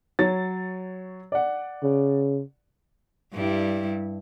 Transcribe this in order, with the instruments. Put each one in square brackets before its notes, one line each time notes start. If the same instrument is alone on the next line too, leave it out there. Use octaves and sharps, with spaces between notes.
[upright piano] F#3 C#5 A6
D5 F#5
[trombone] C#3
[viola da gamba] G2 G3 E4